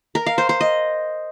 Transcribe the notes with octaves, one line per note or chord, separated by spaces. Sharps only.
A#4
F5
C5
C5
D#5